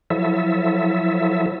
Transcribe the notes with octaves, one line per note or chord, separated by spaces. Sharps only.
F3 F#3 E4 A4 E5